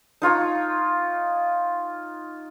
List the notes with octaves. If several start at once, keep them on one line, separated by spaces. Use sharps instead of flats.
D#4 F4 C#5 A#5